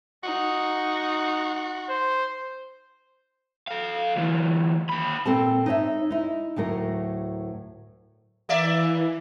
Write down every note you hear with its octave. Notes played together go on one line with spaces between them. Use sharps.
D#4 F#4
C5
A4 F5
D2 E3
D#2 B5
A#2 C#3 C4 A4 A5
D#4 C#5 E5
D#4 E4
D2 A2 F#3 A#4
E3 A#3 D5 E5